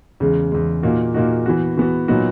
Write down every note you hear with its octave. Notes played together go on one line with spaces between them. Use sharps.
E2 C#3 G#3
E2 C#3 G#3
A#2 A#3 D#4 F#4
A#2 A#3 D#4 F#4
E3 B3 F#4
E3 B3 F#4
A#2 F#3 B3 D#4 F#4